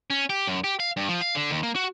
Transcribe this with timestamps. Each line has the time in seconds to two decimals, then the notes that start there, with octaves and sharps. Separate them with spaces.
0.10 C#4
0.30 G4
0.48 F#2
0.64 G4
0.80 F5
0.97 G2
1.09 F3
1.21 F5
1.35 D3
1.51 D#2
1.63 A#3
1.75 F#4